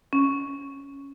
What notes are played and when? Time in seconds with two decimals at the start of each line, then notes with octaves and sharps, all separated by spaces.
0.13 C#4